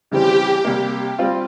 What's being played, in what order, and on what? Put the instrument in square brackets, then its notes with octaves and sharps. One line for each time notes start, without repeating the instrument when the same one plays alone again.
[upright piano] C#3 E3 G3 C4 [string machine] G4
[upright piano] C3 G3 A#3
G3 C4 F4